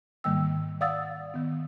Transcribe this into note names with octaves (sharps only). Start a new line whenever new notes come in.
G#2 D#3 G3 A#3 G5 E6
D5 F5 F#5 D#6 E6 A6
D#3 B3